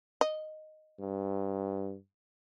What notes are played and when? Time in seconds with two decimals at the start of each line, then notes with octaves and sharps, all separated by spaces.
0.21 D#5
0.99 G2